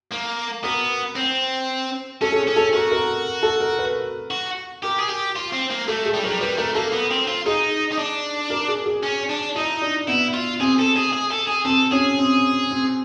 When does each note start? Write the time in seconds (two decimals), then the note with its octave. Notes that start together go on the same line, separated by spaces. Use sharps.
0.11 A#3
0.63 B3 A#4
1.15 C4
2.21 C#4 A4
2.32 A4
2.38 G#4
2.48 C#4
2.56 A4
2.73 F#4 A#4
2.91 A#4
3.43 A4
3.60 A#4
3.79 B4
4.31 F#4
4.83 G4 A#4
4.99 G#4
5.09 G4
5.36 F4
5.53 C4
5.71 A#3
5.88 A3 A4
6.06 G#4
6.14 G3
6.23 F#3 A#4
6.30 G3
6.41 G3 B4
6.58 A3 A#4
6.75 A#3 A4
6.93 B3
7.11 C4
7.28 F4
7.46 D#4 G#4
7.92 D#4
7.98 D4
8.50 A#4
8.68 G#4
8.86 G#4
9.03 C#4
9.29 D4
9.55 D#4 E4
9.82 D4
10.08 B3 E4
10.34 F4
10.60 C4 G#4
10.78 A4
10.96 G#4
11.13 G#4
11.31 A4
11.47 G#4
11.65 C4 A4
11.92 C#4 G#4
12.18 C4
12.71 C4